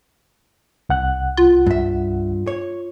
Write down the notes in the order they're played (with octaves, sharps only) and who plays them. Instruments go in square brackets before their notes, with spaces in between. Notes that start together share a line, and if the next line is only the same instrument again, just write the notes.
[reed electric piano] C2 F#5 F#6
[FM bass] F4
[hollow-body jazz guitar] G2 E5
C#5